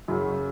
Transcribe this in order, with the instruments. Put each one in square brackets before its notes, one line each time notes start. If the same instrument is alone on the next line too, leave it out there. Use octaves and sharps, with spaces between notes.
[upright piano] F#2 C#3 F#3